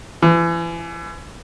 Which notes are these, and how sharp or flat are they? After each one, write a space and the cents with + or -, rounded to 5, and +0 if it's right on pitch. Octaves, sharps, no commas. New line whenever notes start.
E3 +35